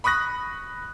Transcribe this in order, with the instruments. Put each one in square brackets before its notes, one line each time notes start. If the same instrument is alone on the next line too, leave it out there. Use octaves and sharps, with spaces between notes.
[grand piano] B5 C#6 D#6 F#6 A#6